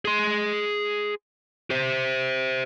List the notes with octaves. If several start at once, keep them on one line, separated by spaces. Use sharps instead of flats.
G#4 C6
G4 C5